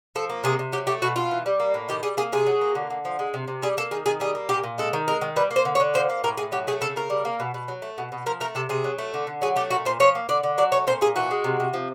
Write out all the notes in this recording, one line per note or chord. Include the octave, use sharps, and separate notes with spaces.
F3 A4
A#3
C3 G#4
C3
F#3 G4
A3 G4
B2 F#4
B2 F4
E3
G3
A#3
A2
D#3 G4
G3 G#4
A#3 G#4
C3 G#4
F#3
A#3
D3
D3
F3
G#3
C3
C3
G3 G#4
A#3 A4
D#3 G#4
D#3 G#4
G3 G#4
A#3
A#2 G4
A#2
G#3 A4
D#3
G#3 A#4
D#3
G3 B4
A#3
C5
D3
C#5
D3
F3 C5
A#3
A2 A#4
A2 G#4
F#3 G4
A3 G#4
C#3 A4
C#3 A#4
G3
A#3
B2
B2
F#3
A3
B2
B2
F3 A#4
A3 A#4
C3 A4
C3 G#4
F#3
A3
D3
D3
F#3 G#4
A3 G4
A#2 F#4
A#2 C5
F3 C#5
A#3
D3 D5
D3
F#3 D5
A3 C#5
A#2 C5
A#2 G#4
E3 F#4
G#3
C3
C3
F3